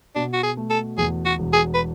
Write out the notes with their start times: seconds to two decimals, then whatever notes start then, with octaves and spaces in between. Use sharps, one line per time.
0.15 B2 D4
0.33 F#4
0.43 G#4
0.57 A3
0.70 A4
0.97 E2 G#4
1.25 F#4
1.39 E1
1.53 G#4
1.74 B4